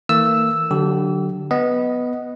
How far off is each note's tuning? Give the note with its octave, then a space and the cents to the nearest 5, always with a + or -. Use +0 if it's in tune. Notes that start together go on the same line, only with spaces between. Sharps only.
E3 -40 A#3 -40 E6 +0
D3 +0 F#3 +0 G4 -35
B3 +0 D#5 +0